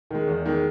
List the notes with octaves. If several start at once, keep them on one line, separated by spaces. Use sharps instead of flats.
D#3 G#3
E2
D#3 G#3